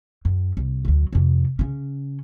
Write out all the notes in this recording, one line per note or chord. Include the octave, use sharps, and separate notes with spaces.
F#2
C2
D2 F#3
F2 C3
C#3 C#4